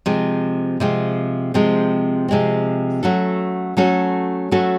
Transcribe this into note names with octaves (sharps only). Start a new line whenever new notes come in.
C3 F3 G#3 C4
C3 F3 G#3 C4
C3 F3 G#3 C4
C3 F3 G#3 C4
F#3 A3 C#4 F#4 A4
F#3 A3 C#4 F#4 A4
F#3 A3 C#4 F#4 A4